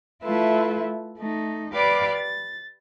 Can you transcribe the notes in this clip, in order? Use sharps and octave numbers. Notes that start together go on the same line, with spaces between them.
A3 E4 F4 A4 B4 E5
A3 D#4
G4 B4 D5 F5 B5 D6
A6